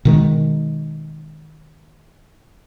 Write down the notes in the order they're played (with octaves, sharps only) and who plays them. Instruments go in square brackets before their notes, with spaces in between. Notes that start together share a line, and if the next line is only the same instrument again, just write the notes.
[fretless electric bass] B2 D#3 G#3